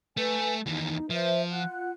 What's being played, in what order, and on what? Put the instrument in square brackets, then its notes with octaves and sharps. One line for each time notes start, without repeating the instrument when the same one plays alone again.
[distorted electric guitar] A3 [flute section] B4 G#5
[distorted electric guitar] D#2 E3 [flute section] D#4
[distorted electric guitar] F3 [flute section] B4 C5 E5
[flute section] F4 F#5 F#6